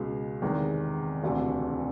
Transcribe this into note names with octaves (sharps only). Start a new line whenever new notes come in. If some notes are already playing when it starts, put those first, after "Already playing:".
Already playing: C#2 B2 G#3
E2 C3 D#3 G#3
E1 D2 C3